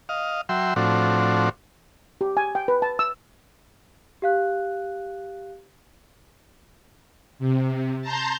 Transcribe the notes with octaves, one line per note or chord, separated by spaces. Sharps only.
D#5 F5
F#3 E5 G5 C6
A2 F3 C4 D4 F#4
G4
G#5
G5
B4
A5
E6
G4 F5 F#6
C3
A5 A#5 C6 G6